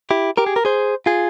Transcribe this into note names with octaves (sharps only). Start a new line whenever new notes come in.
E4 G4
G4 A#4
G#4
A#4
G#4 C5
F4 G#4